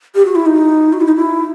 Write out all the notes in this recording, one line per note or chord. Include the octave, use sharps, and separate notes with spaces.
G4
F#4
E4
D#4
F#4
E4
D#4
E4